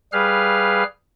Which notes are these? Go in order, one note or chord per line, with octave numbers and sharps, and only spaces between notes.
G3 G#4 B4 F5 F6